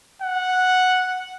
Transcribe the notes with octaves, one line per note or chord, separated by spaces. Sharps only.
F#5